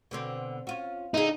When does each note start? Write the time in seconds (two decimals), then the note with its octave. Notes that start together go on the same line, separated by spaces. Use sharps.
0.11 B2 D3 C4
0.67 C#4 F4 F#4
1.14 D3 D#4 G#4